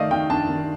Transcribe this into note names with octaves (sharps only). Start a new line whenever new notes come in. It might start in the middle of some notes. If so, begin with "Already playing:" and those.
Already playing: D#3 A3 D5 D#5 F5
D#3 G5
D4 A5
D#3